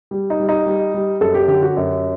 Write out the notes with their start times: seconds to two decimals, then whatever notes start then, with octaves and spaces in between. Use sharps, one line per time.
0.11 G3
0.30 D#4
0.40 G3
0.49 D#4
0.66 G3
0.94 G3
1.21 F#2 A4
1.34 G4
1.48 D3 G4
1.62 F#4
1.77 F#2